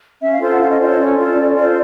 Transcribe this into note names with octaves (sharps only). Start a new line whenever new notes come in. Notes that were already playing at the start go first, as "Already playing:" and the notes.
C#4 E5
F5
F4 A4 C5
F#5
C#4 F5
D#5
F4 A4 C5 D5
C#5
C#4 D5
F4 A4 C5
C#4
F4 A4 C5